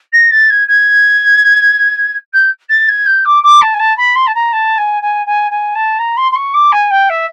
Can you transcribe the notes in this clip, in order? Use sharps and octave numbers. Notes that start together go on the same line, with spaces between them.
A#6
A6
G#6
G#6
G6
A6
G#6
G6
D6
D6
A5
G#5
A5
B5
C6
A5
A#5
A5
G#5
G#5
G#5
G#5
A5
A#5
C6
C6
C#6
D6
G#5
G5
E5